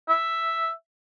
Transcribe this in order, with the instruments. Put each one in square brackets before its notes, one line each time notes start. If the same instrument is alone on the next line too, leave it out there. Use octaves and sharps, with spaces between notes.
[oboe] E5